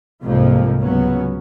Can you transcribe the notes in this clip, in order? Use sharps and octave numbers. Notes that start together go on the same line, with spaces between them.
C2 F2 G#2 C3 F3 A#3
C#2 F#3 B3 C#4